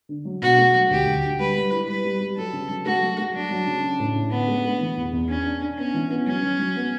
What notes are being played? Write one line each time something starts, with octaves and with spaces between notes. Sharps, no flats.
D3
F#3
B2 F#4
A3
F#3
D2 G4
D2
D3
G3 B4
G3
E4
G3 B4
G3
G3
F#3 A4
C#3
F#3
A3 F#4
F#3
A3
F#3 D4
F#3
C#3
C#4
A2
C#4
D3 B3
A3
A3
E3
E2
E2
C#4 D4
D4
D4
B3 C#4
E3
B3
F#3 C#4
F#3
F#3
B3